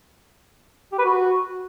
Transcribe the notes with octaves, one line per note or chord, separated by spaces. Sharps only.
G4
B4
F#4